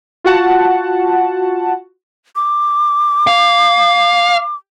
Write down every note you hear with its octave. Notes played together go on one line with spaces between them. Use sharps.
F4 F#4 F#5 A5
D6
F5